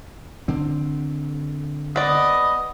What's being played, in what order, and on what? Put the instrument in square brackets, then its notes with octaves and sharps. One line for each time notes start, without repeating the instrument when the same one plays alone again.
[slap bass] D3 C4
[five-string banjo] B3 D5 [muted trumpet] D#5